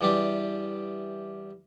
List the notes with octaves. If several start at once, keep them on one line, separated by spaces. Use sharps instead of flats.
E2 E3 G3 D4 G4